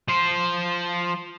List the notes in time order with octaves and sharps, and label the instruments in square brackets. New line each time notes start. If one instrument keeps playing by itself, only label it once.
[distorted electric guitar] F3 C5